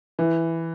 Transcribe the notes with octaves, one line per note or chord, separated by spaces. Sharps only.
E3